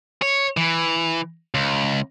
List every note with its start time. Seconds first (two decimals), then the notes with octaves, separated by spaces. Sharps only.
0.22 C#5
0.57 E3
1.54 C#2